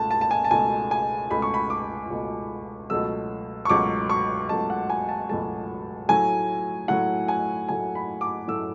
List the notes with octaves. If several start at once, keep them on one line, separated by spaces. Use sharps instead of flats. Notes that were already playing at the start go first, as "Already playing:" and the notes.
Already playing: C#2 B2 A3 A5
A5
A5
G#5
A5
C#2 B2 A3 G#5
G#5
C#2 B2 A3 B5
C#6
B5
D6
C#2 B2 A3
C#2 B2 F#3 A3 E6
C#6
C#2 B2 F#3 A3 D6
C#6
C#2 B2 F#3 A3 A5
F#5
G#5
A5
C#2 B2 F#3 A3 A5
A2 F#3 A3 G#5
A2 F#3 A3 F#5
G#5
A2 F#3 A3 G#5
B5
D6
A2 F#3 A3 E6